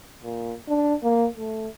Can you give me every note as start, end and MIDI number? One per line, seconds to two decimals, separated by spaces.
0.23 0.53 46
0.69 0.95 62
1.03 1.27 58
1.36 1.68 57